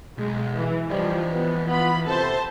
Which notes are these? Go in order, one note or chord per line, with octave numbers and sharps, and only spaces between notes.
B1 G#3
E3
E3 F3 G3 D#5
B3 B4
B3 F4 B5
C3 A4 C5 A5